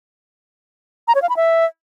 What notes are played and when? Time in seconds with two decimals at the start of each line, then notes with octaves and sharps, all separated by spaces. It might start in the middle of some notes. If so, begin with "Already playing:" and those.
1.08 A#5
1.15 C#5
1.22 F5
1.29 B5
1.36 E5